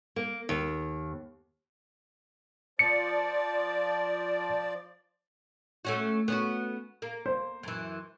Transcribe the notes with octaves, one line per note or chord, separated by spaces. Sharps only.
A#3
D#2
F3 D5 C#7
A3 C#4 F#4
B3 C#4 F#4
A#3
C5
F#2 E3